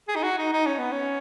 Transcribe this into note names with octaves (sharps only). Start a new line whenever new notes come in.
G#4
D#4
F#4
D#4
D#4
C#4
B3
C#4